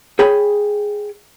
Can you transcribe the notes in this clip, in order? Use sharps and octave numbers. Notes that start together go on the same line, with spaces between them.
G#4 C#5 G5 G#5 B5